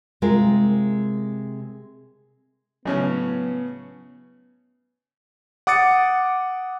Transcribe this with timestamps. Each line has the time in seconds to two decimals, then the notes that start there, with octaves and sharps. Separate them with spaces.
0.22 C3 G#3 F4 A#4
2.85 A2 C#3 F#3 B3 C#4
5.67 F#5 D6 D#6 A6 C#7